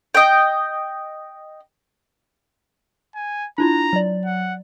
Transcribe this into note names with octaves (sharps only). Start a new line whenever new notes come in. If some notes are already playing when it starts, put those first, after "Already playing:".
D#5 G5
G#5
D4 E4 F4 A#5
F#3 D5
F#5